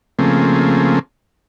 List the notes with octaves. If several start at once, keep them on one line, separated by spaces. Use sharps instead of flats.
C#3 F3 A3 A#3 C4 G#4